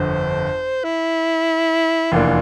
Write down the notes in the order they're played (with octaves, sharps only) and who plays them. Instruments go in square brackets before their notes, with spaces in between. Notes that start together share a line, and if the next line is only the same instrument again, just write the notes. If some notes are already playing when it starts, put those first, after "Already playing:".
Already playing: [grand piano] G1 F2 D3 [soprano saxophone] C5
[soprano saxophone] E4
[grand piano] F1 E2 E3 A#3 D4 [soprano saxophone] F4